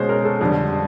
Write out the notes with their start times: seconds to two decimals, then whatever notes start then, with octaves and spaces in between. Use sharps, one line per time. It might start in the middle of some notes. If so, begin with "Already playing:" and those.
Already playing: B2 G#3 C#4 C5
0.09 A#4
0.25 A4
0.41 F2 D3 G3